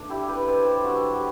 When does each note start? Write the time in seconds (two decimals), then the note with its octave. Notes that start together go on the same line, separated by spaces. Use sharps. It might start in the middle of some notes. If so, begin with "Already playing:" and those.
Already playing: A3 D4
0.10 E4 G4
0.28 G4 B4
0.42 B4
0.48 A4 C5
0.66 G4 B4
0.84 D3 F#3 A3 F#4 A4
1.15 G4